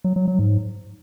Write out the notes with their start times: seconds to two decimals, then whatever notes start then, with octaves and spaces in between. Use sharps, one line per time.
0.04 F#3
0.16 F#3
0.28 F#3
0.39 G#2